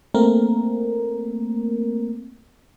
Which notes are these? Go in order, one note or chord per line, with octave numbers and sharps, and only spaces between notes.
A3 A#3 C4 A#4